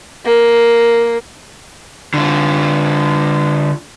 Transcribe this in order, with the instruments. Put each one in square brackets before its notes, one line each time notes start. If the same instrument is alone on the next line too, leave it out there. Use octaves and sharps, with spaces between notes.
[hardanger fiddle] A#3
[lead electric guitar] D3 F4